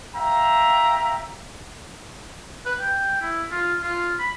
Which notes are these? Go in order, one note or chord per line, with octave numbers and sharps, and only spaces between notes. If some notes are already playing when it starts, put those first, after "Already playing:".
E5 F5 G5 A#5
B4
G5
E4
F4
F4
B5